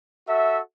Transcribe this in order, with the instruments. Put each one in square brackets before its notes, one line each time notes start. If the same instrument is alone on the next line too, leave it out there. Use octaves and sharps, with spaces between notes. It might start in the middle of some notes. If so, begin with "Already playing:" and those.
[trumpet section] F#4 A4 E5